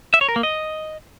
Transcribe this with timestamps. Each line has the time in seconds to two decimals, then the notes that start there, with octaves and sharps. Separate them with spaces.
0.14 E5
0.21 C#5
0.29 A#4
0.36 A#3
0.43 D#5